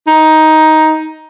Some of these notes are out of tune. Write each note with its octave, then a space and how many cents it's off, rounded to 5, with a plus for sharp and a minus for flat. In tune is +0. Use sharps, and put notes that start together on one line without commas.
D#4 +10